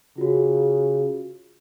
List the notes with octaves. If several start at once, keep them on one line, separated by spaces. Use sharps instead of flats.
C#3 F4 F#4